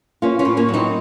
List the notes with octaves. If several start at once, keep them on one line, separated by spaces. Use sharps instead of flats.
A#3 C#4 F4
C#4 F4
A2
A#3 C#4
F#3
C4 D#4